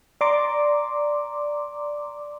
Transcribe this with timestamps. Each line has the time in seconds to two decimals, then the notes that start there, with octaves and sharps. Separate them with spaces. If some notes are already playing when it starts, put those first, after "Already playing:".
0.21 D5 A#5 C6 D6